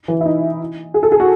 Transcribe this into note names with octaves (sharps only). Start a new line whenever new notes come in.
E3
E4
D#4
G#4
A4
G#4
F#4